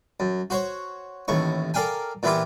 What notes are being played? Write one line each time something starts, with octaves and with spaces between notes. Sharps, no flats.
F#2
F#4 C5 C#5
A1 D#2 A2 C#6
A4 A#4 D5 F5 G5 G#5
A#2 E3 B3 E4 F4 G4